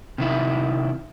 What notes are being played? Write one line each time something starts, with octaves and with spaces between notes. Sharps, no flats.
C3 D#3 E4